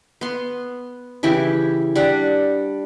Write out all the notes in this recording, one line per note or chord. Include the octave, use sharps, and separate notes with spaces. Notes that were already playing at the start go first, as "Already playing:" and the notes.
B3 C6
C#3 E3 E4 G4
G3 D4 F#5